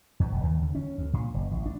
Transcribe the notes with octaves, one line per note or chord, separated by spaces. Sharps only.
E2
E1
D#2
D3
C#4
D2
A#2
F#1
A1
D4